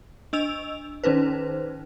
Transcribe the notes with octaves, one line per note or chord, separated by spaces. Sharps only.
D4 D#5 E6 F7
D#3 C#4 D#4 B4 C5